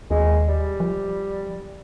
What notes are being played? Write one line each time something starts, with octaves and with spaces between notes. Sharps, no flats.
D#2 G#3
G3
F3